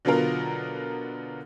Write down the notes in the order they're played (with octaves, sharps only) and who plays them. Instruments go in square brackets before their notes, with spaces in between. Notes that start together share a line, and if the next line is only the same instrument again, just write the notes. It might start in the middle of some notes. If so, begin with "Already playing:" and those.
[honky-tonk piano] B2 D3 F#3 B3 F4 A#4